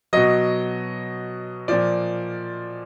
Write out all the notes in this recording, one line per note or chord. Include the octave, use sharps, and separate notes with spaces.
B2 F#3 D#5
A#2 F3 D5